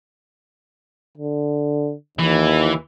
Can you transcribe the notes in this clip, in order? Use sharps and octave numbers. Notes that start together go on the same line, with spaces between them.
D3
D#2 E3